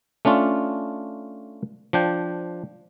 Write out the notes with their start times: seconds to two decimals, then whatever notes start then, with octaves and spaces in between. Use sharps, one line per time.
0.25 A3 C#4 D4 F4
1.93 F3 D4 G5